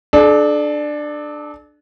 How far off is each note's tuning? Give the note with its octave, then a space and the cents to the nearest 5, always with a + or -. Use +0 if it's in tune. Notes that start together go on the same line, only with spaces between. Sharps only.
D4 +15 A4 -40